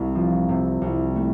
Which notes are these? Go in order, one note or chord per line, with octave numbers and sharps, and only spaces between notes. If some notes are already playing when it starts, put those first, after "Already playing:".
Already playing: C2
F3
C3
C2
A3